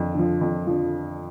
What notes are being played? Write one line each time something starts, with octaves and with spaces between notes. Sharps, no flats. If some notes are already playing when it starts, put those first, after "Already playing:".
Already playing: F2 D3 F3
D3 F3
F2
D3 F3